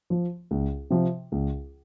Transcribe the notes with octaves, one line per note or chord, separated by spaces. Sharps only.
F3
C#2
C3 F3
C#2